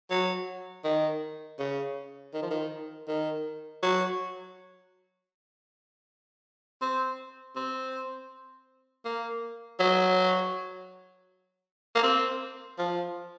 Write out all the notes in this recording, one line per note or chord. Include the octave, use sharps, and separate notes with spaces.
F#3
D#3
C#3
D#3
F3
D#3
D#3
F#3
C4
C4
A#3
F#3
A#3
C4
F3